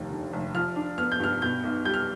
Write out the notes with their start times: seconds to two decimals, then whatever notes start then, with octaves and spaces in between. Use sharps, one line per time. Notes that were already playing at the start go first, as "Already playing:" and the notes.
Already playing: F1 D#2
0.10 D3
0.33 F1
0.54 F3 F6
0.76 D4
0.98 B3 F6
1.12 G6
1.20 G2 F6
1.42 B2 G6
1.64 B1
1.85 G3 G6
1.94 F6